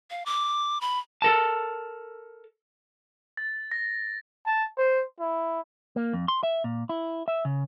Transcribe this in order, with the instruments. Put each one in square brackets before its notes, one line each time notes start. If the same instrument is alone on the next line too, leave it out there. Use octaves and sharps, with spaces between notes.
[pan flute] F5
D6
B5
[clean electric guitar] A4 A#4 A5
[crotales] A6
A#6
[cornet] A5
C5
E4
[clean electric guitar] A#3
F2
C6
E5
A#2
E4
E5
C#3